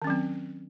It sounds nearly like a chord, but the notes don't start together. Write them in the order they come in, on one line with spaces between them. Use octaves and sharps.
D#3 C#4 F#3 C4